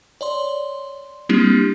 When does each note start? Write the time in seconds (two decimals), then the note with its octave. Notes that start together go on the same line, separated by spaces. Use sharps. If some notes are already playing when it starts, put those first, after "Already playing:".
0.21 C#5 D5 C6
1.29 G3 A#3 C4 D4 E4 G4